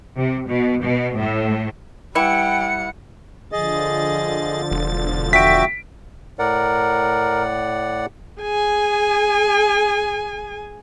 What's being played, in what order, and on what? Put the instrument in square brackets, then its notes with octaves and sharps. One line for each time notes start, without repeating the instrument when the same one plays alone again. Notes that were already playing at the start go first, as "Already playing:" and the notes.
[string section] C3
B2
B2
A2
[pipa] E3 E4 [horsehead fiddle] G3 F#5 [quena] G5 [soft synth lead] C#7
[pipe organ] D3 F3 A6 [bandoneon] G#4 D#5
[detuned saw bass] E1
[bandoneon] F#4 E5 G5 [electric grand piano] B6 D7
[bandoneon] A2 D5 F#5 [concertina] A#4
[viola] G#4 G#5